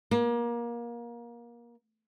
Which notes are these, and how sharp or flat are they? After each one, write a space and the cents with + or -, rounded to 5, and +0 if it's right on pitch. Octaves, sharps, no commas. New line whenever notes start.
A#3 +25